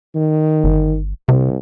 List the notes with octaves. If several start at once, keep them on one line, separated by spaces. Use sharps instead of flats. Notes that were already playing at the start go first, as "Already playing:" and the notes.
D#3
G1
C2 C3